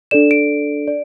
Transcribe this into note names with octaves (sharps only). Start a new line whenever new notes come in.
D4 A4 D5 E7
D7
D5